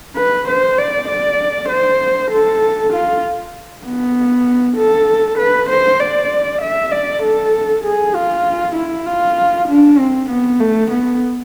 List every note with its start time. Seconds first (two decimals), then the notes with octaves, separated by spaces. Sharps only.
0.16 B4
0.48 C5
0.79 D5
1.09 D5
1.70 C5
2.31 A4
2.93 F4
3.86 B3
4.77 A4
5.38 B4
5.70 C5
6.00 D5
6.62 E5
6.92 D5
7.23 A4
7.84 G#4
8.15 F4
8.76 E4
9.07 F4
9.68 D4
9.99 C4
10.30 B3
10.60 A3
10.91 B3